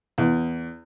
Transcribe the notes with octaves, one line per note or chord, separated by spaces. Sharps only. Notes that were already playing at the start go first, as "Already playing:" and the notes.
E2